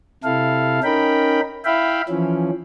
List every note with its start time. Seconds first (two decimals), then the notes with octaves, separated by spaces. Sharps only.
0.24 C3 E4 A4 F5
0.84 C#4 D#4 A#4 G5 B5
1.65 E4 E5 F5 G5 B5
2.09 E3 F3 C#4